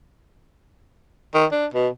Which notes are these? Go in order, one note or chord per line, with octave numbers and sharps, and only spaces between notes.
D#3
D4
B2